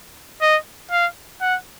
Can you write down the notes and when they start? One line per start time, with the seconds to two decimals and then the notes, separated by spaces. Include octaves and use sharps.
0.42 D#5
0.91 F5
1.41 F#5